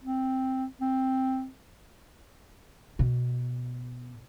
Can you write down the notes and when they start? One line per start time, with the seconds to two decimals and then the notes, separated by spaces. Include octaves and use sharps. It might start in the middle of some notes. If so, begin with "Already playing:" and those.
0.04 C4
0.81 C4
2.99 B2